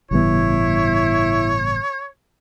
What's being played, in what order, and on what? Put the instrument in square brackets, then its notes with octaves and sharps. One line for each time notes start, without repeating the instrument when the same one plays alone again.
[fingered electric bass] G1 A2 E3 [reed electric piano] C#3 G3 B3 [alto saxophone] E4 [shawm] C#5